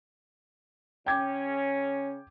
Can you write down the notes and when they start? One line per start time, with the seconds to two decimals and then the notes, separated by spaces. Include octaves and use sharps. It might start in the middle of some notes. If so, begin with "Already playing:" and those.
1.06 C#3 C#4 G5 D6 G#6